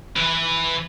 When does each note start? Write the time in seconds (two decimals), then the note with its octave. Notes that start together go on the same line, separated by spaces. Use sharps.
0.16 E3 B4